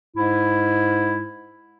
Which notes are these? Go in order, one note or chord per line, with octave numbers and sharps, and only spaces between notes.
G#2 G#3 E4